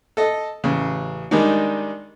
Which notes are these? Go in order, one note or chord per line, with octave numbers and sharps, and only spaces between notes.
A4 D#5
A1 C#3
D#3 G3 G#3 D4 D#4